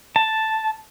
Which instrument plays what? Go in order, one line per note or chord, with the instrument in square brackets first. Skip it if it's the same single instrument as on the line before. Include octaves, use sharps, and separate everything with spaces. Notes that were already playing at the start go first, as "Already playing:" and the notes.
[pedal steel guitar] A5